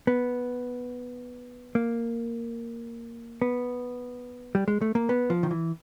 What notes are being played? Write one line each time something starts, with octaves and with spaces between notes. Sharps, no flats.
B3
A#3
B3
G3
G#3
A3
A#3
B3
F3
D#3
E3